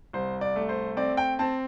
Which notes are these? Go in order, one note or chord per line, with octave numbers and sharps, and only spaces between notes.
C2 C5
D5
A3
C5
C4 D5
G5
C4 A5